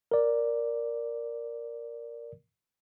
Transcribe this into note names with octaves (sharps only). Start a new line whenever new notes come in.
A#4 D5